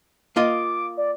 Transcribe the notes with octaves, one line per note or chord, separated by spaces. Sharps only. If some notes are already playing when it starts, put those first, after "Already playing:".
A#3 F4 D#5 D6
D5